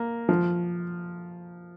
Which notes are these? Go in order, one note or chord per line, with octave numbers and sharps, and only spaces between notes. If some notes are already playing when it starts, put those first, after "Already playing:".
Already playing: A#3
F3